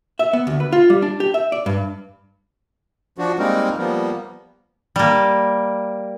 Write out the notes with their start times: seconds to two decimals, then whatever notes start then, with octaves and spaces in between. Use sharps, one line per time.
0.19 E5
0.33 B3
0.47 D2
0.60 B4
0.72 F4
0.90 G3
1.02 D4
1.20 G4
1.34 E5
1.52 D5
1.66 G2
3.18 F3 D4 F#4
3.39 G3 G#3 A#3 C4 D#4 A#4
3.78 F3 G3 A#3 B3
4.96 G3 A#3